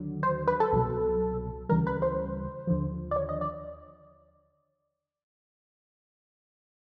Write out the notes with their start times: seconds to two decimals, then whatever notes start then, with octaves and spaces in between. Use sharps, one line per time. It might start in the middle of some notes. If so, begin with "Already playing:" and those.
Already playing: D#2 D3 F#3
0.23 C5
0.47 B4
0.60 A4
0.72 C2 B2 F#3
1.69 D2 C#3 E3 G3 A#4
1.87 B4
2.02 C5
2.67 D#2 D3 F3
3.11 D5
3.16 C#5
3.29 D#5
3.41 D5